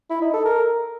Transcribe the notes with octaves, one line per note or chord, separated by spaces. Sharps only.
E4
D#4
A4
A#4